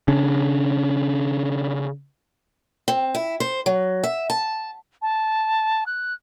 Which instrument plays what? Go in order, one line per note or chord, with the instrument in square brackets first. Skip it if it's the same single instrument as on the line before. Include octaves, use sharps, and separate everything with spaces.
[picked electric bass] C#3 C#4 D4
[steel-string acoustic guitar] C4
E4
C5
F#3
E5
A5
[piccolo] A5
F#6